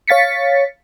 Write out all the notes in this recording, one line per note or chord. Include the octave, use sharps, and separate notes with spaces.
C#5 F5 A6 B6 C#7